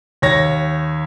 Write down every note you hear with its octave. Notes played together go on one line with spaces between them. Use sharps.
D#2 C#5 A#6